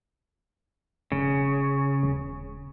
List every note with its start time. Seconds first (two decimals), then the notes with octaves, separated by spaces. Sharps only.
1.12 E1 C#3
2.03 D#1